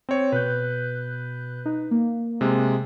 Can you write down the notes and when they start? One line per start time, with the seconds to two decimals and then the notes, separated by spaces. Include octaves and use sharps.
0.09 C4 C#5
0.32 B2 B4 F#6 G6
1.65 D#4
1.91 A#3
2.41 C3 G#3